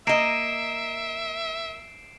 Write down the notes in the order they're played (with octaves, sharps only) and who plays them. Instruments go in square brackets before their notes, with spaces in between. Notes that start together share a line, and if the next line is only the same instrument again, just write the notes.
[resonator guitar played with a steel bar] A#3 D#5 [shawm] E5 [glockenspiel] C7 D7 E7